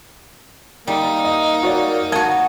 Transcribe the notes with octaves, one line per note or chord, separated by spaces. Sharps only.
G3 A#3 D#4
D#5
F#4 C#5 D5
F#4 D#5 A5 G#6